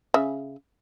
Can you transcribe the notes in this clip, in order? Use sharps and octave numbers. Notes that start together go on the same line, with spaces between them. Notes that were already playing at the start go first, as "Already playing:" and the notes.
C#3 E5